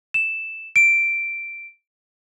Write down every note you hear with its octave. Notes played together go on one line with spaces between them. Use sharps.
E7
D7